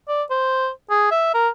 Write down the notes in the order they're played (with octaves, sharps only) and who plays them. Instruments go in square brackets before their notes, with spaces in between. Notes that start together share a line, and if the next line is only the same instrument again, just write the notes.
[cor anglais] D5
C5
G#4
E5
A#4